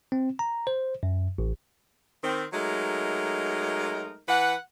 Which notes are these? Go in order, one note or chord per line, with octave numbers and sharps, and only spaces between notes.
C4
A#5
C5
F#2
A1
D#3 C4
F#3 G#3 A3 D#4 A#4
E3 B4 F#5